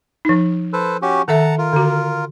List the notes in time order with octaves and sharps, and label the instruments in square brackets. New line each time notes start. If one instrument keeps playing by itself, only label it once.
[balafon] F3 D#4
[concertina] A4 B4 C5
C#4 F#4 G4
[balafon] D#3 A4 E5 [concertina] F#5 A5 A#5
[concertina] F4 A#4
[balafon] D3 F#4